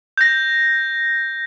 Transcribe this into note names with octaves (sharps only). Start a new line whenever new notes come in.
G6 A#6